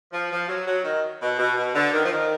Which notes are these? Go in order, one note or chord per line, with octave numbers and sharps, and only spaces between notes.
F3
F3
F#3
F#3
D#3
B2
B2
B2
D3
D#3
F3
D#3